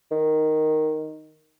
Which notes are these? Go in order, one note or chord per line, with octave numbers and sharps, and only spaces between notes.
D#3